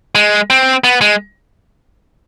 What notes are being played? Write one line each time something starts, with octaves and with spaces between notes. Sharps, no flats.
G#3
C4
B3
G#3